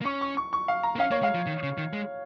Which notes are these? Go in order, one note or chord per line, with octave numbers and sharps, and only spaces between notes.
A#3
C#4 C#6
C#6
C#6
C#6
F5
A#5
A#3
C#4 F5
A#3 C#5
G#3 F5
F3
D#3
C#3
D#3
G#3